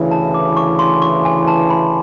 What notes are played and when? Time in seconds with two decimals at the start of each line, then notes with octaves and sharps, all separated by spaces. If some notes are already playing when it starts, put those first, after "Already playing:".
Already playing: D2 C#3 E3
0.11 A5
0.34 D6
0.57 C#6
0.79 C6
1.02 C#6
1.25 G#5
1.47 A5
1.70 B5